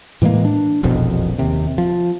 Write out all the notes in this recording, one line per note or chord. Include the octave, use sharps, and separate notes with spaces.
A2 E3 G#3 A#3
D4
E1 A#1 F2 B2
D#2 C3
F3